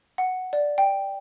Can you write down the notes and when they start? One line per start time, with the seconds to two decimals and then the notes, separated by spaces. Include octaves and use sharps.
0.18 F#5
0.53 D5
0.78 G5